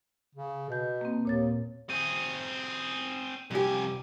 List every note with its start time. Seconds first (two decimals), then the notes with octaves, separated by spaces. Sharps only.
0.35 C#3
0.69 B2 B4 G6
1.01 A#3 C4
1.25 D#2 A#2 C#5 A6
1.90 C4 G#4 D#7
3.51 C2 F2 G4 G#5